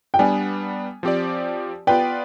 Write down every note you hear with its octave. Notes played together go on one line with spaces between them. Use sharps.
G5
G3 B3 D4 G#5
F3 C4 G4 D5
B3 F4 B4 D5 G5